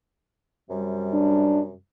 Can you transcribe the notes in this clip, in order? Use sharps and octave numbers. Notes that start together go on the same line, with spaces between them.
F#2 C3 G3
D4